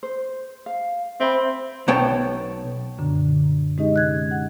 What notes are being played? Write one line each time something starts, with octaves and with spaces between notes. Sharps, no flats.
C5
F5
C4 E5 B5
B1 B3 C#5 G5 A5
F#2 A#2 D3 D4
G#3 C#4 D#4 G4 G#4 D#5
C3 F#6 G#6
F#5